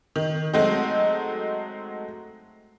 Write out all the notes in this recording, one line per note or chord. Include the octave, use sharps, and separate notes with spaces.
D#3
F#3 G#3 A3 C4 D#4